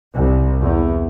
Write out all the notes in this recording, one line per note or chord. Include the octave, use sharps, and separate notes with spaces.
C2
E2